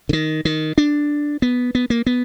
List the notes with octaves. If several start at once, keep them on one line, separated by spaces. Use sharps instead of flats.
D3
D#3
D#3
D4
B3
B3
A#3
B3